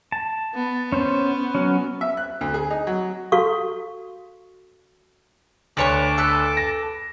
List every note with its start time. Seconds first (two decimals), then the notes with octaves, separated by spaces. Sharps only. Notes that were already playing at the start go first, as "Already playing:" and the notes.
0.12 A5
0.54 B3
0.92 C#4 C5
1.55 F#3 C#4
2.01 E5
2.17 F#6
2.41 D2
2.54 G#4
2.70 D#4
2.87 F#3
3.32 F#4 A4 F5 C#6
5.77 D2 B4 C#5 A5 C#6 D6
6.18 A4 B4
6.57 A#6